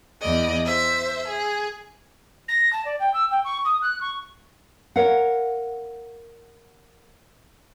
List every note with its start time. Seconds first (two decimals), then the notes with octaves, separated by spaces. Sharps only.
0.20 E2 D5 D#5
0.66 C5 E5
1.28 G#4
2.48 A#6
2.73 A5
2.85 D5
2.99 G5
3.14 E6
3.31 G5
3.45 C#6
3.65 D#6
3.82 F#6
4.01 C#6
4.96 A#4 C#5 F5 F#5